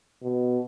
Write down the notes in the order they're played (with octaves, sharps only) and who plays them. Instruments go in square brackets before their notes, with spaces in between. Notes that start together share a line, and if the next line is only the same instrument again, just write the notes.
[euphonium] B2